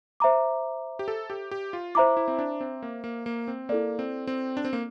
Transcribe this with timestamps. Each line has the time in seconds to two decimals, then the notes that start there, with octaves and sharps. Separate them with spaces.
0.20 C5 E5 A#5 D6
0.99 G4
1.08 A4
1.30 G4
1.51 G4
1.73 F4
1.95 E4 C5 E5 A#5 D6
2.17 E4
2.28 C4
2.39 D4
2.61 C4
2.83 A#3
3.04 A#3
3.26 A#3
3.48 C4
3.69 A#3 E4 A4 D5
3.99 C4
4.27 C4
4.57 D4
4.65 C4
4.73 A#3